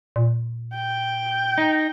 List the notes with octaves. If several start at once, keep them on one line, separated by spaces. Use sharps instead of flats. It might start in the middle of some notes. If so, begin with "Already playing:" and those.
A#2
G5
D#4